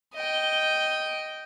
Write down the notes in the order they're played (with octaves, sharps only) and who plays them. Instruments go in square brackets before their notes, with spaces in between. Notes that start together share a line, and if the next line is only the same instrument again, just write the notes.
[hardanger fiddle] D#5 G5